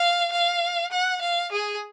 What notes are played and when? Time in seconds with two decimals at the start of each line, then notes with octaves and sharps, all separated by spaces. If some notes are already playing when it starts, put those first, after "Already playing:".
Already playing: F5
0.32 F5
0.92 F#5
1.21 F5
1.52 G#4